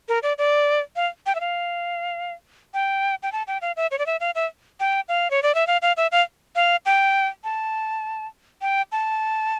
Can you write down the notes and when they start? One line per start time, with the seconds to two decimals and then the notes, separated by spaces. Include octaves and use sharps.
0.09 A#4
0.23 D5
0.38 D5
0.96 F5
1.26 G5
1.35 E5
1.40 F5
2.74 G5
3.23 G5
3.32 A5
3.47 G5
3.62 F5
3.77 E5
3.91 C#5
3.99 D5
4.06 E5
4.20 F5
4.35 E5
4.80 G5
5.09 F5
5.31 C#5
5.43 D5
5.55 E5
5.67 F5
5.82 F5
5.97 E5
6.12 F5
6.56 F5
6.86 G5
7.44 A5
8.62 G5
8.92 A5